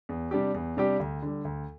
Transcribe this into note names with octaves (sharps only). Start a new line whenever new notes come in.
E2
C3 G3 D4 G4
E2
C3 G3 D4 G4
D2
D3 G3
D2